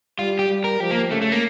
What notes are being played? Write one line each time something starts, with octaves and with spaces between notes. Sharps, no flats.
G3 F4
G4
G3
A#4
F3 G4
A#3
C#3 A3
A3
A#3